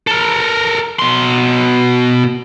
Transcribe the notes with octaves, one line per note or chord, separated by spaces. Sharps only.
A4 A#4
B2 C6